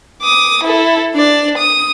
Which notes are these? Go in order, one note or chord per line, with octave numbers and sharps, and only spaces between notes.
D6 D#6
E4 A4
D4 D5
D#6